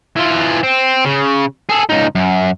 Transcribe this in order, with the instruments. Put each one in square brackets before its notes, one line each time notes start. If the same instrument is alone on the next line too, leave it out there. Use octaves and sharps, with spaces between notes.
[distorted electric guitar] E3 F4
C4
C#3
G#4 A4
C#2 D#4
F#2